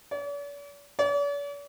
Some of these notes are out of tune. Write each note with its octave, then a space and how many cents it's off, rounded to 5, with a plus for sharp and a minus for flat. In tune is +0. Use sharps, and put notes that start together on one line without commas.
D5 -45
D5 -45